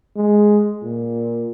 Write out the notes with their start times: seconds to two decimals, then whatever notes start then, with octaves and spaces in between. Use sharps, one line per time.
0.16 G#3
0.82 A#2